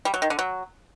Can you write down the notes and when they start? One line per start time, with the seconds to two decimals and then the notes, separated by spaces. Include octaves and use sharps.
0.05 G3
0.14 F#3
0.22 D#3
0.30 D3
0.39 F#3